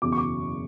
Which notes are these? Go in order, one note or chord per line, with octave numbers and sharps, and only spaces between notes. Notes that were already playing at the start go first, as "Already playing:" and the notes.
F#1 E2 B2 F#3 D6
C#6
D6